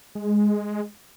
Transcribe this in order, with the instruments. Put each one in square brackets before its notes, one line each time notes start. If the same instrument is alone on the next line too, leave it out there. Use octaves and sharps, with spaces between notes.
[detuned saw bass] G#3